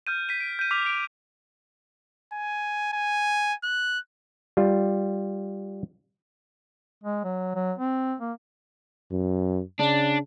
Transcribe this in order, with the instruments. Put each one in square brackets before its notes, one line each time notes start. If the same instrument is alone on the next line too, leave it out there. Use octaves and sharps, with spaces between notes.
[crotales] F6 G6 D#7
B6 D#7
D7
G6 D#7
D6 F6 B6 F7
D7
[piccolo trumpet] G#5
G#5
F#6
[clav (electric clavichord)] G3 F4
[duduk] G#3
F#3
F#3
C4
A#3
[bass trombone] F#2
[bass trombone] C#3 [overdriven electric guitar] D4